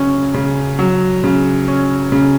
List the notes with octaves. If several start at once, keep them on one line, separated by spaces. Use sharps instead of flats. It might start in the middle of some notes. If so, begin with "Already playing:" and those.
Already playing: C#3 F#3 C#4
C#3
F#3
C#3
C#4
C#3